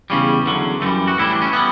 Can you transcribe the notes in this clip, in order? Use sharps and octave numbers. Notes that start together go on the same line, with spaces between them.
E2 C#3 G3 C#4
E2 D3 F#3
F#2 E3 G3 A3
F#4
A2 E3 G3 E4
D4
C#4
E3 G3 B3